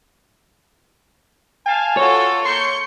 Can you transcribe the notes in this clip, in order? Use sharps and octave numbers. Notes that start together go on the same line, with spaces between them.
F5 G#5 A5
F4 F#4 A4 C#5
A#3 C6 C#6 G6 C#7